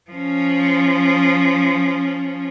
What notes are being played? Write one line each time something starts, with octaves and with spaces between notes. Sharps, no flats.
F3 C#4